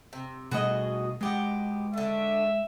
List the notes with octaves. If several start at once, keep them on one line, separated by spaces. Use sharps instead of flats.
C3
B2 G3 A3 F#4 G#4 D#5
B2 G#3 G4 F#5
D3 A3 E5